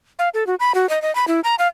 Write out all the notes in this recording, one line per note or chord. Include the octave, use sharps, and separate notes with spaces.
F5
A4
F#4
B5
F#4
D#5
D#5
B5
E4
A#5
F5